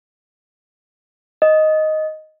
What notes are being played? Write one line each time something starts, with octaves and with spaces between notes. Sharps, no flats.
D#5